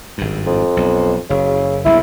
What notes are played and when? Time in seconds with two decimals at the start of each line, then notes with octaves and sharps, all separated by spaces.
0.18 G#1 G2
0.46 F2
0.77 B1
1.30 F#1 C#3
1.85 F#1 B1 G2 E4